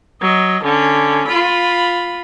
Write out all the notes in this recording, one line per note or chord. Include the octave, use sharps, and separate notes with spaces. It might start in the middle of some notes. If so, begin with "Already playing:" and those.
F#3 D#5
D3 C#4
F4 B5